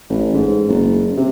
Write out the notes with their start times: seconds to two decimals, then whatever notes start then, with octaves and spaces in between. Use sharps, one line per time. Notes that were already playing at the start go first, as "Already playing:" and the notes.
0.10 A1
0.34 G#2
0.69 F#1
1.17 C3